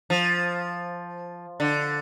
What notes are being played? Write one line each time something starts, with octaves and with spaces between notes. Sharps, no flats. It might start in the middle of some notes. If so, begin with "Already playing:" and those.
F3
D3